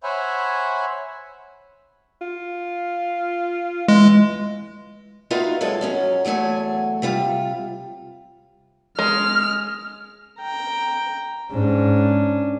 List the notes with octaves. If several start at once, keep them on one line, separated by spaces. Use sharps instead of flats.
C5 C#5 E5 F#5 G#5 B5
F4
E3 G#3
D#4 F4 F#4 B4 E5 F5
F#3 G#3 A4
F#2 F#3 C#4
E2 F#3 A3 A4 G#5
C3 G3 F4
G#3 F6
G5 A#5
G#2 C#4 D4